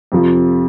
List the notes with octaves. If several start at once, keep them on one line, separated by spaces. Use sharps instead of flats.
F2 C3 F3